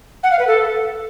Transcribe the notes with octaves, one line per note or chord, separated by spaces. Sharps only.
F#5
F5
B4
A4